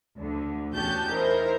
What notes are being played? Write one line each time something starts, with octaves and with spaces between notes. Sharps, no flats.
D2 D3
E2 C#4 F#4 G4 A5 G6
D#4 E4 A#4 C5